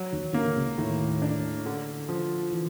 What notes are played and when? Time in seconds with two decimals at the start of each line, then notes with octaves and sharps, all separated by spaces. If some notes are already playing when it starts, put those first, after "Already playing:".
Already playing: F#3
0.13 D#2 D#3
0.33 D#3 A#3
0.45 D3
0.56 C#2 C#3
0.78 D#2 A2 D#3
1.22 D4
1.66 D3
2.09 F3
2.53 E3